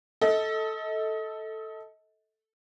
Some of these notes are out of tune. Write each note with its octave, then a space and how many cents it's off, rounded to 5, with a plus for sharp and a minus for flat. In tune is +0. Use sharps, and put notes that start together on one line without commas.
A4 +0 D#5 +35